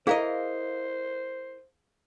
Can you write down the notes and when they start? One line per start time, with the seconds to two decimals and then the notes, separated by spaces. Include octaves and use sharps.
0.07 E4 G#4 A#4 C5 D#5 F5